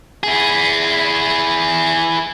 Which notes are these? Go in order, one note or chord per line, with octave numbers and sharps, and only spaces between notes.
E4 G#4